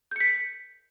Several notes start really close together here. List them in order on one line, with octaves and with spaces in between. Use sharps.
G6 C#7 B6